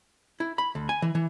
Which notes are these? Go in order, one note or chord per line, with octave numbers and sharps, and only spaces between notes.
E4
B5
D2
G#5
E3
E3